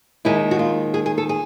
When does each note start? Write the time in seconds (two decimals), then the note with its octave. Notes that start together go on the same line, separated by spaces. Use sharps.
0.25 D#2 D#3 G#3 E4
0.51 F#4
0.59 F4
0.94 G#4
1.06 G#4
1.18 A4
1.29 G#4